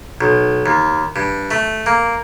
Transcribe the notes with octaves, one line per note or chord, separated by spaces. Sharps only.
B1
D#2
G2
A3
A#3